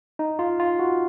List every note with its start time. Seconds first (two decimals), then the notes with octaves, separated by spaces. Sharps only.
0.19 D#4
0.39 F4
0.60 F4
0.79 F#4